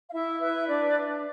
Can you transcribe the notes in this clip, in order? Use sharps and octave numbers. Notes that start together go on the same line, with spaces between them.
F5
E4 E5
B4 E5
D4 D5